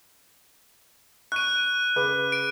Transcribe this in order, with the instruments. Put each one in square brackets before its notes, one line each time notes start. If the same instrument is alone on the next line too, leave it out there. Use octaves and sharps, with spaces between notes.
[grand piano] C#6 D7 [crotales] F#6 D#7
[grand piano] C#3 B4 D6
[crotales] D7